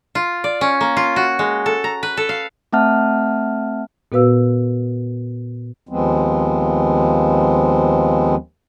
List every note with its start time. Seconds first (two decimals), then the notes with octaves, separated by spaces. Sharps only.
0.15 F4
0.44 D5
0.61 C#4
0.81 A#3
0.97 F4
1.16 F#4
1.39 G#3
1.66 A4
1.84 A#5
2.03 B4
2.17 A4
2.29 F5
2.73 A3 C4 E5 F#5 A5 F6
4.12 A#2 B3 F#4 B4 F5 E6
5.89 D#2 F3 G#3 B3 C4